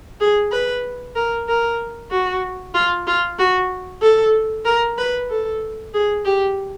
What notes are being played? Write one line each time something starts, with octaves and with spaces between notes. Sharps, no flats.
G#4
B4
A#4
A#4
F#4
F4
F4
F#4
A4
A#4
B4
A4
G#4
G4